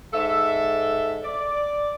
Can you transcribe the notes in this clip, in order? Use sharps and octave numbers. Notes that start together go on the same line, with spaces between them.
G#2 A4 E5
D5